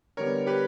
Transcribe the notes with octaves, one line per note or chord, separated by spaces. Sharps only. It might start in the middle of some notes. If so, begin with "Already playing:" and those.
D3 G3 B3 A#4 C#5
G4 B4